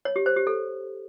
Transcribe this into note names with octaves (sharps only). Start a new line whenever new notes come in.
C#5
G4
C5
G4
A4